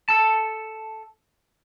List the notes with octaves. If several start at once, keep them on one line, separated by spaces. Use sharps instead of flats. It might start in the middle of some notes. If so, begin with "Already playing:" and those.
A4 A5